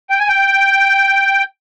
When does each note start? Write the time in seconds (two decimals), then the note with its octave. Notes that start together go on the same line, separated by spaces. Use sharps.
0.10 G5
0.19 G#5
0.28 G5